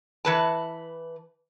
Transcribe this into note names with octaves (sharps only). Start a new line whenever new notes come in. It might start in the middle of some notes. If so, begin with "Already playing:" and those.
E3 B4 A5